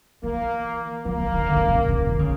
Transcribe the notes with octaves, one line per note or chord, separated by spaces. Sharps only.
E3 A#3
F3 A#3
E3
D#3
D3
D3
C#3
C#3
D#3
C#3